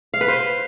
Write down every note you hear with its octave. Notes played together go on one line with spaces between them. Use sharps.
F5
B4
C5